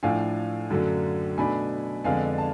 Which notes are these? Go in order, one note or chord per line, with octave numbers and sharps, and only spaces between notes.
A2 F3 A3 D4 F5 G#5
F#2 D3 F#3 A3 D4
B2 A3 D4 G#5 B5
F2 D3 G#3 B3 D4 F5 G#5
A5